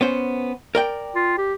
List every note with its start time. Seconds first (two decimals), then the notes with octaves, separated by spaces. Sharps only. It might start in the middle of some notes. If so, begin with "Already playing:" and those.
0.01 B3 C#4 C5
0.75 A#4 D5 G5
1.16 F4
1.38 G4